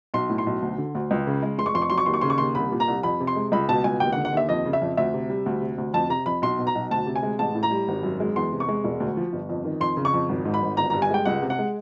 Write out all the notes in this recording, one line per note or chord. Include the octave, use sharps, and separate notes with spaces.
B1 C6
A2
C6
B1
D2
D3
D2
C#2
C#3
G#3
F1 C6
C#6
F2 C6
C#6
F#3 C6
C#6
D#2 C6
C#6
C#3 C6
C#6
D#2 C6
C2 B5
A#2
A#5
C2
F2 B5
C3
C6
G#3
C#2 B5
B2 A5
C#2 G#5
D#2 G5
F#5
D3
F#5
D#2 E5
F2 D#5
C#3
E5
F2
D2 E5
C3
G3
D2
C3
D2
F2 A5
C3 A#5
F2 B5
B1 C6
B2
A#5
B1
D2 A5
C3
G#5
G#3
A1 A5
A2
A#5
G3
G#1
F#2
G#3
E2 C6
C3
C#6
G#3
E1
D2
F3
G1
F2
D#3
F2 C6
C#3
C#6
F2
G#1
G#2
B5
G#1
G1 A#5
A#5
G2
G#5
G#3 G5
C#2 F#5
C3
F#5
G#3